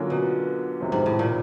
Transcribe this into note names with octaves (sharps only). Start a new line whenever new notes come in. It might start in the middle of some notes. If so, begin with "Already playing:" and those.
Already playing: D3 F#3 A#3 C#4 F4
B2
F2 C3 D#3
G#2
A2
A#2